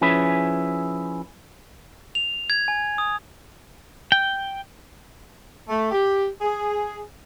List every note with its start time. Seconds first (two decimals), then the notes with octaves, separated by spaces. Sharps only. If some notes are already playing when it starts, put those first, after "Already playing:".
0.01 F3 C#4 E4 G#4 B4
2.15 F7
2.50 G#6
2.68 G#5
2.98 D#6
4.12 G5
5.69 A3
5.91 G4
6.41 G#4